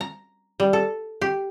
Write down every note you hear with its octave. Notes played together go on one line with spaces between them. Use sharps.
A#5
G3
A4
G4